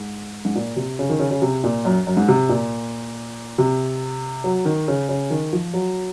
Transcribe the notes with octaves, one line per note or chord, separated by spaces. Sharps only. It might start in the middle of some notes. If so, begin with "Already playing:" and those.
Already playing: G#2
G#2
A#2
C3
C#3
D#3
C#3
C#3
C3
A#2
F#2
F#2
G#2
C3
A#2
C3
F#3
D#3
C#3
C#3
D#3
F3
F#3